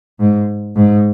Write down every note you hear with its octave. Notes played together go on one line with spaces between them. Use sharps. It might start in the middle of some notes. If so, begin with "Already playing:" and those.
G#2
G#2